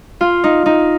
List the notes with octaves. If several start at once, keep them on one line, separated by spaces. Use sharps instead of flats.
F4
D#4
D#4